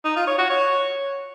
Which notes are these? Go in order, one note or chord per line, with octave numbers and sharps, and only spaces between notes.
D#4
F4
C#5
F#4
C#5